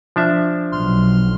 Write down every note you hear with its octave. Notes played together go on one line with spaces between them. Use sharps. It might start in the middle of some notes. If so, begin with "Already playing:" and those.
F3 D4 E5
B1 C6 F6